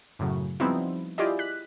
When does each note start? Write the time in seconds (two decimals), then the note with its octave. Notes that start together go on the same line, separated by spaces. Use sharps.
0.19 F#2 A2 C#3 F#3
0.60 F3 G3 B3 C4 D#4 E4
1.18 E4 F4 G4 G#4 D5 D#5
1.39 F#6 B6